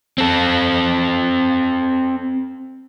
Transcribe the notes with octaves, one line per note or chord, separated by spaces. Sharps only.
C4 A4